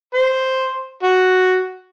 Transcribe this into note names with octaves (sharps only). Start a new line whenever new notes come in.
C5
F#4